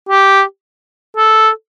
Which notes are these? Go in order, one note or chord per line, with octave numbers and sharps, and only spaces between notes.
G4
A4